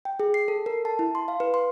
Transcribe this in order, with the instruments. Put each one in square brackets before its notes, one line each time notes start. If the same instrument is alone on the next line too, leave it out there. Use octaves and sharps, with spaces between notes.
[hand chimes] G5
G#4
C7
A4
A#4
A5
E4
C6
F5
B4
C6